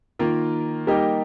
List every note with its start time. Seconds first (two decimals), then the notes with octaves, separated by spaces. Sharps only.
0.19 D#3 A#3 F4 A#4
0.87 G3 A#3 D#4 G4